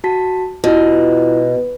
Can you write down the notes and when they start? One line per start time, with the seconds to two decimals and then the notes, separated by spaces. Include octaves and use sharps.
0.04 F#4 A5 B6
0.64 B2 E4 F4